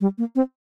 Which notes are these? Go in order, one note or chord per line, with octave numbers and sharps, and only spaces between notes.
G3
A#3
C4